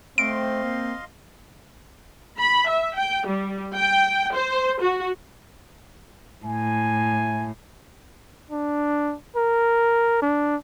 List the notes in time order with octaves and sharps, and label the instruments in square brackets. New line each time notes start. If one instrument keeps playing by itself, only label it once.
[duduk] A3 [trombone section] C4 [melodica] D#5 F5 C6 [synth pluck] D7
[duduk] A#3
[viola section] B5
E5
G5
G3
G5
C5
F#4
[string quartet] A2 [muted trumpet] G#5
[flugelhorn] D4
A#4
D4